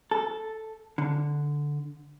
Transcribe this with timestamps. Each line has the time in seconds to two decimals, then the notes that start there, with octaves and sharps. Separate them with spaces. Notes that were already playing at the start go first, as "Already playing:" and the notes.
0.11 A4
0.98 D3